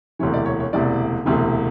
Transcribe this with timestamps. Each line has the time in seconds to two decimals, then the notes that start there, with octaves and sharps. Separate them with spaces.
0.19 E1 D2 C3 E3 C#5
0.34 D5
0.46 C#5
0.60 C#5
0.73 E1 D2 C3 E3 D5
1.25 E1 D2 C3 E3